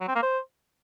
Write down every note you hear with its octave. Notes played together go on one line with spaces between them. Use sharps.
F#3
C4
A#3
C5